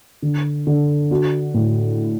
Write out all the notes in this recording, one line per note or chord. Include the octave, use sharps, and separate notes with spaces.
D3
D3
F#4
A2